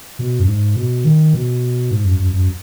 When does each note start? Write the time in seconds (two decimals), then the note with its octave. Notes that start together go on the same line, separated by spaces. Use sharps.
0.19 B2
0.40 F#2
0.47 G#2
0.76 B2
1.05 D#3
1.33 B2
1.91 G#2
2.04 F#2
2.20 F#2
2.33 F#2